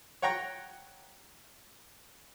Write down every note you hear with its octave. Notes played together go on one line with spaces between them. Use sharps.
C#5 F#5 G5 A#5 C#6